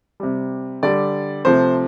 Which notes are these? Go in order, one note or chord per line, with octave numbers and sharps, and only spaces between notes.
C3 G3
D3 G3 D5
C3 F3 A3 C5